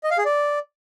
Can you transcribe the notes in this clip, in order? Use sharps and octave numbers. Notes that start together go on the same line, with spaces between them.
D#5
F5
G#4
D5